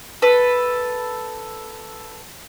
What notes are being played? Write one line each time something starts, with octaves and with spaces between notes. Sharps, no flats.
A4 B4